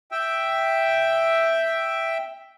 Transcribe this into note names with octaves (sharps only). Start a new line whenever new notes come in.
E5 G5